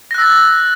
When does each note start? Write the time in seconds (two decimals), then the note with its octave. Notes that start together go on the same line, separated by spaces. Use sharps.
0.11 A#6
0.14 F#6
0.18 E6
0.22 A6